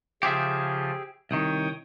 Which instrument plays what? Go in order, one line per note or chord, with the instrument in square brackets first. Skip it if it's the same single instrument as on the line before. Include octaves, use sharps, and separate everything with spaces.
[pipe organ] C#3 F3 F4 [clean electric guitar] G4 G#4 E5
[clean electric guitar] C2 D#3 [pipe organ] C#5 G5 D#6